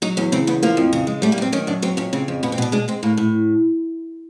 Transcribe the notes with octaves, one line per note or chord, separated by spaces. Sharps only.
F#3 D#4
E2 C#4
C#3 C4
E2 B3
F3 A#3
F2
C#3
G#3
G3 A3
A#3
F#2 C4
D#3 C#4
F#2 D4
F#3 C4
F2 C#4
C#3 C4
F2
B2 B3
C4
B2 D4
G#3 D4
G#3 C4
A2 A#3
A2